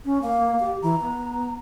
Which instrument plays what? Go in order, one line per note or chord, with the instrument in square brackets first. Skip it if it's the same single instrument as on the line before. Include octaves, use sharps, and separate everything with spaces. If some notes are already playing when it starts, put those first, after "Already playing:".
[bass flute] C#4
[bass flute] A#3 [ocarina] F5
[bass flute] G4
[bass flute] E3 [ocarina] A#5
[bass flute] B3